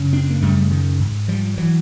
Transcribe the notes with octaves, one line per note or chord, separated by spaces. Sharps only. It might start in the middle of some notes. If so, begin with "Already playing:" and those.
Already playing: F#2 C#3
C4 D4
A#3
F#2 C#3 G3 A3
D#3
G#2
F3 G3
E3 F#3